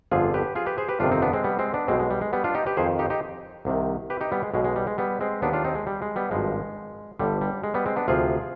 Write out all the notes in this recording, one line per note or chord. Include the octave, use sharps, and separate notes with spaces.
G1 F2 D3 F3 F4 G#4
G4 B4
F4 G#4
G4 B4
G#4 C5
G4 B4
G1 F2 C3 D#3 D4 F4
C4 D#4
B3 D4
G#3 C4
G3 B3
G#3 C4
B3 D4
B1 B2 G#3 C4
G#3
G3
G#3
G3 B3
D4 F4
D#4 G4
G4 B4
F2 D#3 G#4 C5
D#4 G4
D#4 G4
C2 C3 D#3
G4 B4
D#4 G4
G3 B3
G#3
B1 B2 G#3
G#3
G3
G#3
G3 B3
G#3 C4
D#2 D#3 B3 D4
D4 F4
C4 D#4
G#3
G3
G#3
G3 B3
G#1 G2 F3 G#3
G1 G2 D3 G3
G3
G#3
G3 B3
G#3 C4
B3 D4
D2 C3 F3 F4 G#4